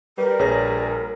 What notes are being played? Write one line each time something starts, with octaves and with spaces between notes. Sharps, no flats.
G3 A#4 B4
A#1 G#4 C#5 A#6